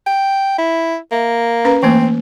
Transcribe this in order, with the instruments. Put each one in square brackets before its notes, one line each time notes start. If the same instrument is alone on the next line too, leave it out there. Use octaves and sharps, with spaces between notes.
[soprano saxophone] G5
E4
[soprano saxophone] A#3 [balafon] E5
[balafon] C#4 B4 A#5
[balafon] E3 A3 A#3 [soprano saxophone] C4